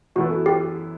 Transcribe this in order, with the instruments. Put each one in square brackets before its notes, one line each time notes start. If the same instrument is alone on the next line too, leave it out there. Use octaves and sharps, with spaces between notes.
[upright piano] F#2 E3 B3 E4 A4 [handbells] F#4
[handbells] G4